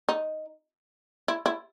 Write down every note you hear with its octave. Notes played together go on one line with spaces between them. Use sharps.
D#4
E4
E4